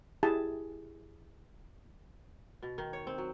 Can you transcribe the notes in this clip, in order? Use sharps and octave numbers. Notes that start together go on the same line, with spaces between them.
E4 G4 G#4 A5
B2
D#3
C#5
C4
F#3